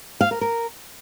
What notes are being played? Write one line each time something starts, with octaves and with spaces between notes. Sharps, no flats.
F5
A#4
A#4